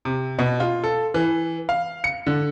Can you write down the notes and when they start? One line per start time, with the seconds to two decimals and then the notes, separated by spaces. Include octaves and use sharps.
0.05 C3
0.39 B2
0.60 F4
0.84 A4
1.14 E3
1.69 F5
2.04 C#7
2.27 D3